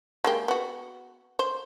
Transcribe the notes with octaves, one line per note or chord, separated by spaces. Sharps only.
G#3 A#3 G4
B3 F#4
C5